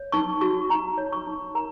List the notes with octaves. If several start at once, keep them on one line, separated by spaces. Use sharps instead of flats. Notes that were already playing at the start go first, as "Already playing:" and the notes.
Already playing: C#5
D#4 C#6
F#4 C#6
D#4 A#5
C#5
C#6
D#4
A#4 A#5